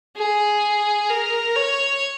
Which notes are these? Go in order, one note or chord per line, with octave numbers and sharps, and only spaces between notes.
G#4
A#4
C#5